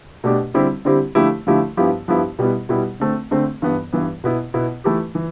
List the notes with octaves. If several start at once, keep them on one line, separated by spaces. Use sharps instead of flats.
B2 A3 D4 G4
D3 G3 C4 E4 G4
D3 G3 C4 E4 G4
D3 F3 A3 E4 G4
D3 F3 A3 E4 G4
G2 F3 B3 E4 G4
G2 F3 B3 E4 G4
B2 G3 B3 E4
B2 G3 B3 E4
D3 A3 C4
D3 A3 C4
G2 E3 B3
G2 E3 B3
B2 B3 E4
B2 B3 E4
E3 A3 E4 G4
E3